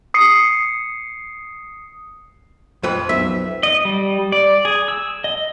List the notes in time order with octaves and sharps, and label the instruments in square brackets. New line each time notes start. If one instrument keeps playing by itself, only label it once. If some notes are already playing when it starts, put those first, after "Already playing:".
[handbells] D#6 C7 C#7
[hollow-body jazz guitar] F2 B4
[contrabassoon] B1 [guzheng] E5
[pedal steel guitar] D#5
G3
D5
G#4
E6
D#5